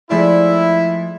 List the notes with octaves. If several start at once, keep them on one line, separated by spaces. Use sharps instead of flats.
F3 G#3 A3 E4 D5